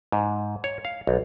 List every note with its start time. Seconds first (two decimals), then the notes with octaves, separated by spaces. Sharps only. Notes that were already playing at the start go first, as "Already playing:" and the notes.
0.12 G#2
0.64 C#5
0.85 F5
1.07 B1